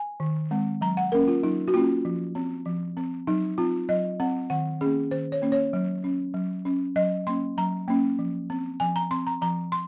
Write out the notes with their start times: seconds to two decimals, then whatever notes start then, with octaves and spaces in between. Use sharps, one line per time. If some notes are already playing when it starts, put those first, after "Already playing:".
Already playing: G#5
0.20 D#3
0.51 G#3 C4
0.81 F#3 A#5
0.97 F#5
1.12 A#3 C#4 A#4
1.28 F4
1.43 F#3 D#4
1.68 F#4
1.74 A#3 C#4 F4
2.05 F3
2.35 C4
2.65 F3
2.97 C4
3.27 F#3 D#4
3.58 C4 F4
3.89 F#3 D#5
4.20 C4 F#5
4.50 D#3 F#5
4.81 A#3 C#4 G#4
5.11 D#3 C5
5.32 C#5
5.42 A#3 C#4
5.52 C#5
5.73 F#3
6.04 C#4
6.34 F#3
6.65 C#4
6.96 F#3 D#5
7.27 A#3 C#4 C6
7.58 F#3 A#5
7.88 A#3 C#4
8.19 F3
8.50 C4
8.80 F3 G#5
8.96 A#5
9.11 C4 C6
9.27 A#5
9.41 F3 A#5
9.72 C6